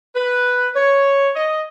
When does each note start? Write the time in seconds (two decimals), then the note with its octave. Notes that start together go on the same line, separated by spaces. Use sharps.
0.16 B4
0.76 C#5
1.35 D#5